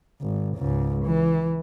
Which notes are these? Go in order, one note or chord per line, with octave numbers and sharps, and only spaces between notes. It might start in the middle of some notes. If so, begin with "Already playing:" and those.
G#1
C#2 G#2
E3